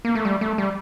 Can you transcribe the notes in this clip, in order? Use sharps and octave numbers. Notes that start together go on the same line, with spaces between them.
A#3
A3
G3
A3
G3